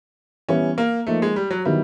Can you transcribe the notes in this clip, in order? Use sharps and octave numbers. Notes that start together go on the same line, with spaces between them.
E3 G3 B3 C#4 E4
A#3
F3 A3 A#3 D#4
G#3
G3
F#3
D#3 F#3 G3 B3 E4